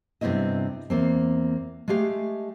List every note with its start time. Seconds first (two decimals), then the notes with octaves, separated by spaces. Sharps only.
0.21 G2 C3 B3 C4 E4 D#5
0.90 E2 A#3 C4
1.88 G#3 A3 G4 F5